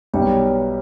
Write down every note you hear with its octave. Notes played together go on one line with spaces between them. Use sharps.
B1 B2 G3 C#5
B4
C#5